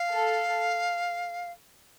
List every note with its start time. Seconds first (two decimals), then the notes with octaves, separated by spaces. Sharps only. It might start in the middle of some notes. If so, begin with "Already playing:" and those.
Already playing: F5
0.11 A4